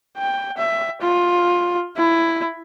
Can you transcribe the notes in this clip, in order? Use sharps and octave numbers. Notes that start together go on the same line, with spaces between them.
G5
E5
F4
E4